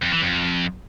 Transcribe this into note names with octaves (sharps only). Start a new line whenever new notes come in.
F2
E3
F2